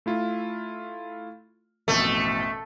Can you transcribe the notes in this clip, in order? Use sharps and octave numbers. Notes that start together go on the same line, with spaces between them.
A3 E4 F4
A1 F2 B2 A3